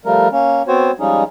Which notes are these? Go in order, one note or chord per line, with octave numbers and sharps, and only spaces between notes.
F3 G3 A3 A#4
A#3 C#4
B3 C4 F#4 C5 C#5
F3 G3 G#3 C#4 D#4 G#4